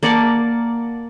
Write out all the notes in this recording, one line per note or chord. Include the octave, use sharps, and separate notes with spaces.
A#3 D5 F#5 A5